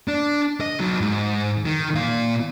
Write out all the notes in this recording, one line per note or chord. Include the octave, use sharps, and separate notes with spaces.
D4
D#5
F#3 D#4
G#2
D#3
A#2 F5